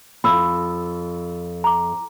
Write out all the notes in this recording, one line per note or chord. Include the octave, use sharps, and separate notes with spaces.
F2 B5 E6
A#5 D6